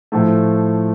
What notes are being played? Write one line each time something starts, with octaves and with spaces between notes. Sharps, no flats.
A2 F3 A3